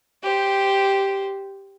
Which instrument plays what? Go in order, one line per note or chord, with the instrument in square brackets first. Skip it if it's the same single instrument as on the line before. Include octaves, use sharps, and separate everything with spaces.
[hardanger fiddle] G4 C5